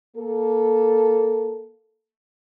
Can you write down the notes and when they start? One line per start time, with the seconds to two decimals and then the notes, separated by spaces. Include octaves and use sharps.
0.17 A#3 A4